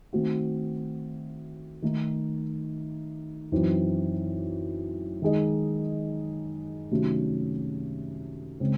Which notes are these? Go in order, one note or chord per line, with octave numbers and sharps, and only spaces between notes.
D#3 A3 C4 F#4
D#3 A3 D#4
F#2 E3 C4 D#4
D#3 G#3 D#4 G#4 D#5
C3 D#3 F#3 A3 C#4
C#3 G#3 C4